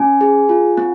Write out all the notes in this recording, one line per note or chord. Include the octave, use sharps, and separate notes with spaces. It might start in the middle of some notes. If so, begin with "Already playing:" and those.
Already playing: C#4 G#5
G#4
F4
C4